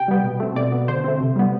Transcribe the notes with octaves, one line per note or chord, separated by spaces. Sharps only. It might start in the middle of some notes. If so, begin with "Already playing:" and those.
Already playing: C3 G5
G3 B3
B2
A3 C4
B2 D5
B3
D3 C5
A3 C4
C3
G3 B3